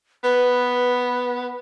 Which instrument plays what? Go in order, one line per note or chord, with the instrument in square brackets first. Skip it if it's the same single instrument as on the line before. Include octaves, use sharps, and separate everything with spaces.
[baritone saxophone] B3 [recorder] B4